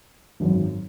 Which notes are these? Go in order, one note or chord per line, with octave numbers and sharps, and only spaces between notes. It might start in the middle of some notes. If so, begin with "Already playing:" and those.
G#1 F#2 D#3